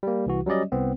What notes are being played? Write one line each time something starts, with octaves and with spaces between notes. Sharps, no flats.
G3 A#3
C2 E3 F#4
F#3 G3 C#4 D5 D#5
C2 B3 C4